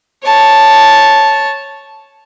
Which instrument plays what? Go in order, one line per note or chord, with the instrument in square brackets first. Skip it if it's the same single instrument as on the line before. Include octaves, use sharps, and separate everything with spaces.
[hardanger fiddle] C#5 A5